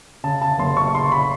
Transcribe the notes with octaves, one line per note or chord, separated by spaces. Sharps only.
C#3 A5
A5
F#1 C6
C#6
C#3 C6
B5